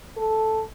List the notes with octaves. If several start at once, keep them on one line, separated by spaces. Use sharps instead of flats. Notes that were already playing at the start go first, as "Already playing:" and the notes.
A4